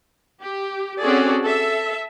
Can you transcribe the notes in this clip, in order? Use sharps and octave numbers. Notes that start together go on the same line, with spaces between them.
G4
C4 C#4 F#4 G#4 A4 D5
A4 E5